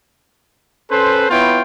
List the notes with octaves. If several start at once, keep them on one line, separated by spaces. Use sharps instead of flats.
C#4 A4 B4 C5
B3 E4 F4 C#5 G5